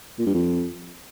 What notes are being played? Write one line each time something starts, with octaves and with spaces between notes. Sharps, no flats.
A#2
G2
F2